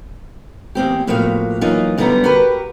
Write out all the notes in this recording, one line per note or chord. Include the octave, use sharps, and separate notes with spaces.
E2 A#3 C4 G4
A2 F3 A#3 F#4 F5
E3 F#3 A#3 D#4 F4
F#2 D3 G3 B3 D5 A#5
F#4 G4 A#4 B4